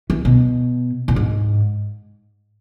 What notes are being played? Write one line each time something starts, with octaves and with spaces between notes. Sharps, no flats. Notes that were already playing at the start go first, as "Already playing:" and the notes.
E3
B2
A#2
G#2